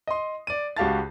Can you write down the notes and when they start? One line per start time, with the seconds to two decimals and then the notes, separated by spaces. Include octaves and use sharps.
0.07 D#5 C6
0.47 D5 D#7
0.77 C#2 F#4 G4 F5 A5 A6